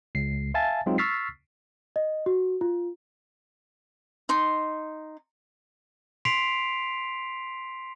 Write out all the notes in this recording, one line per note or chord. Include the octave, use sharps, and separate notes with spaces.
C#2 C7
E5 F5 G#5 A5 A6
F#3 G#3 C4 D#4 F4
C#6 E6 F6 A6 B6 C7
D#5
F#4
F4
D#4 C6
C6 B6 C7 D7 F7